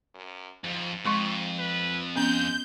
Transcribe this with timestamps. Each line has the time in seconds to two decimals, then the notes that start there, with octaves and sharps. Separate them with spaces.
0.14 F#2
0.65 F2 G#2
1.06 F2 G#3 C6 C#6
1.59 B4
2.16 G#3 B3 C#4 G6